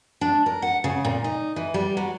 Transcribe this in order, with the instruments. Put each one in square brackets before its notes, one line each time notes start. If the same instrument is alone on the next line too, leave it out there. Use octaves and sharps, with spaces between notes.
[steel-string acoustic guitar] D4
A#4
F#5
C#3
A#2
D#4
E3
G3
F#3